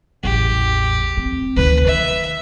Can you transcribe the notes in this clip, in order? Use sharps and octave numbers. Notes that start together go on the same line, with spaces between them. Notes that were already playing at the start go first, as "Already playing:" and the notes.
A1 E2 G4
C4
D2 D#3 B4
D#3 E5